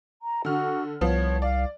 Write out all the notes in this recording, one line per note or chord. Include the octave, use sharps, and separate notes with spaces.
A#5
D3 F#4 F6
C2 F3 B3 C#5
D5 F5